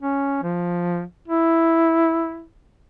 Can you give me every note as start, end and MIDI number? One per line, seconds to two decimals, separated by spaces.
0.01 0.40 61
0.43 1.02 53
1.28 2.45 64